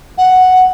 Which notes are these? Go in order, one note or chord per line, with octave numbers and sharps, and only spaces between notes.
F#5